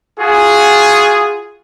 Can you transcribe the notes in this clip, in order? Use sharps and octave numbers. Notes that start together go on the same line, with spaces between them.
F4 F#4 G#4